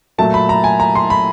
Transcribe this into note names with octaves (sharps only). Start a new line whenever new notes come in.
A#2 F#3 A3 A5
B5
A#5
G#5
A#5
C6
B5